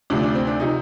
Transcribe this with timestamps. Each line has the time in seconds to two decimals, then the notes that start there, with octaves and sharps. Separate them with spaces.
0.10 D2 C3 F3 D4
0.22 D4
0.35 C4
0.47 D4
0.60 C3 F3 D#4